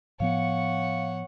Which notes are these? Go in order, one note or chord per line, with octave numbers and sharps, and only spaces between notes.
A2 F3 B3 C#5 F5 F#5